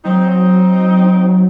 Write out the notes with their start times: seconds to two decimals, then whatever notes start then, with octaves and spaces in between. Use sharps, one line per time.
0.05 F#3 C4 D#4